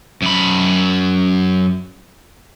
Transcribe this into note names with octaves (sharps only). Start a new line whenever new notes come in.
F#2 B5